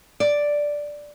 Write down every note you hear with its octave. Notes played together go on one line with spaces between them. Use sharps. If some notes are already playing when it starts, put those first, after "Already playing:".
D5